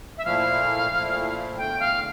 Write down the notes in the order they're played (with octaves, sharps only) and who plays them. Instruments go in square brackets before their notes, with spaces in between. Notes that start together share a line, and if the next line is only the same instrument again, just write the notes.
[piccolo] E5
[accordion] A#2 F3 A3 E4 [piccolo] F5
[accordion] A#2 F3 A3 E4
[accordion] E2 D3 A3 [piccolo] G5
[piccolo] F5